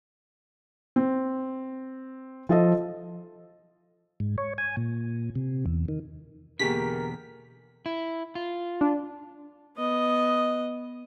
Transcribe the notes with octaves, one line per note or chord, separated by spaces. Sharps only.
C4
F3 F4 A4 D#5
G#2
C#5
G#5
A#2
C3
E2
D#3
E2 B2 D3 A#3 G4 G#4 A#4 B6
E4
F4
D4
B3 D#5